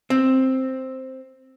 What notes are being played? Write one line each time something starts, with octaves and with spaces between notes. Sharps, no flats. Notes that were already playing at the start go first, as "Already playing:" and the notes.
C4